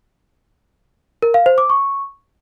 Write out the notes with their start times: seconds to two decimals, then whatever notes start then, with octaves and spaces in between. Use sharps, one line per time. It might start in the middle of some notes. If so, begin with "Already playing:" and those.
1.22 A#4
1.34 F5
1.46 C5
1.58 D6
1.70 C#6